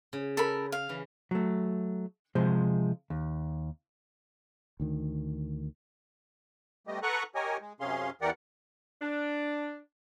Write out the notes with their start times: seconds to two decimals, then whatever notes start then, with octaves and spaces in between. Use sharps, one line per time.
0.13 C#3
0.37 A4 A#4 B5
0.72 F5
0.89 C#3 E3
1.31 F#3 A3
2.35 C3 F3 G#3 G#4 C5
3.10 D#2
4.80 D2 D#3
6.87 G3 A3 B3 G4 D#5
7.03 A4 B4 F#5 A#5 C#6 F#6
7.35 G4 A#4 C#5 D#5 G#5
7.61 G#3
7.80 F#2 C3 C#4 G#4 F5 C6
8.21 E2 E3 G4 A#4 D5 F#5
9.01 D4